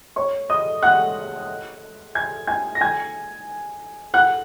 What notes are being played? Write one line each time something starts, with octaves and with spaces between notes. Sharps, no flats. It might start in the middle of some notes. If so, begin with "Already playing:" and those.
C#5 C#6
D#5 D#6
F#5 F#6
G#5 G#6
G#5 G#6
A#6
G#5 G#6
F#5 F#6